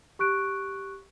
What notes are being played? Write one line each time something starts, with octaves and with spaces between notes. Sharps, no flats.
G4 C#6 F#6 D7